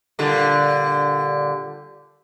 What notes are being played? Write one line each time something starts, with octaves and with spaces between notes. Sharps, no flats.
A#2 D3 G3